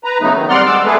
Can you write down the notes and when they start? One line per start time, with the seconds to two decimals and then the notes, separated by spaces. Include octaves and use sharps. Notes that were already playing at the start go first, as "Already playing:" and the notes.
0.04 B4 A#5
0.21 C#3 F#3 A3 B3 D#4
0.34 D#3
0.49 G3 C4 D5 F#5 C6 F6
0.66 G#3 D6 E6
0.85 A3 G#4 A4 B4